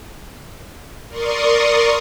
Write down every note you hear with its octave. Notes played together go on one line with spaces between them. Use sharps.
A#4 D5 C6 C#6 D#6